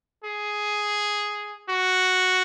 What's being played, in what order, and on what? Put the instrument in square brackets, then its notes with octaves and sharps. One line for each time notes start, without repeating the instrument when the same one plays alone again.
[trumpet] G#4
F#4